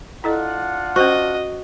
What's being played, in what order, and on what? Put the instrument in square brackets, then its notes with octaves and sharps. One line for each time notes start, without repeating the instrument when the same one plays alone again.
[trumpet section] D4 F4 F#5 [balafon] E4 A4 D#5
[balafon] C#4 C5 [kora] F#4 [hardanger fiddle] D#5